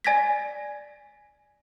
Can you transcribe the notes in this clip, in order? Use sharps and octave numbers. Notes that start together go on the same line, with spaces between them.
D5 G#5 G#6 A#6 B6